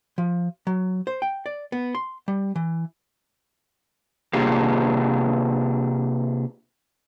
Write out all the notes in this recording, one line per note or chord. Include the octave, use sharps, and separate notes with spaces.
F3
F#3
C5
G5
D5
B3
C6
G3
E3
C3 A#3 D4 F4 G4 G#4